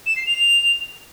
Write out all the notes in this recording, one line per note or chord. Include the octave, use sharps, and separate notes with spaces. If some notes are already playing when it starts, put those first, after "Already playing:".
E7
C7
F7